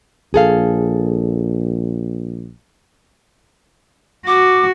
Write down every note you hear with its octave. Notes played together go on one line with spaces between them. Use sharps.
A#1 G#4 A4 F5
F#4 D6